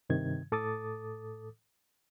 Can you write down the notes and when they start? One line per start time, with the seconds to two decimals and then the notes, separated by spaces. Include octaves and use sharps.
0.10 G2 C3 D#3 G#6
0.52 A2 A4 D6 D#6 A6